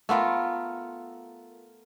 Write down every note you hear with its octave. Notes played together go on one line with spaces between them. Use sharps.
A3 B3 F4 A#4